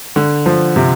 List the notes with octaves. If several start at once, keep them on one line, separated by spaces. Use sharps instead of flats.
D3
F3
C3